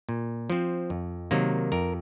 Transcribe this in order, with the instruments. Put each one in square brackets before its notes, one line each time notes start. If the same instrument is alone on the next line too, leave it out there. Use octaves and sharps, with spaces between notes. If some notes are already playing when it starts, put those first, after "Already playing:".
[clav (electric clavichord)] A#2
F3 C4
F2
C3 D#3 F#3 A#3
F2 A#4